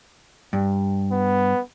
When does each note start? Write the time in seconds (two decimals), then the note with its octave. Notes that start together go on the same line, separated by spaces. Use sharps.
0.53 G2
1.12 B3